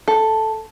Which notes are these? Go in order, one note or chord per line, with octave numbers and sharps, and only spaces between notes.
A4